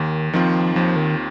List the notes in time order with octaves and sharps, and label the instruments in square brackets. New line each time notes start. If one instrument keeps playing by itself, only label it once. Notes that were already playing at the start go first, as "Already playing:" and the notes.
Already playing: [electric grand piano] D#2 [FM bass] D#3
[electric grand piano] D#3 C4 F4 [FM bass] F3
[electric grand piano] D#2 [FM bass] F3
[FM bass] D#3